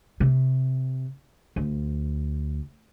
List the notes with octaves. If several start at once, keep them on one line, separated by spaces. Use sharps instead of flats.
C3
D2